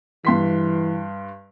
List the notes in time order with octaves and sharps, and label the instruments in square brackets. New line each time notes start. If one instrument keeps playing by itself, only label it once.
[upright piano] G2 C6 B6 [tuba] E3